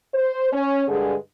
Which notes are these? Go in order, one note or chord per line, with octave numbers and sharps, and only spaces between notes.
C5
C#4
G2 D3 G#3 G#4